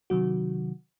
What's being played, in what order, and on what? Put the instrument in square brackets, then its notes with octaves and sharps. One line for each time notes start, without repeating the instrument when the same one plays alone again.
[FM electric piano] C3 D#3 F#3 F#4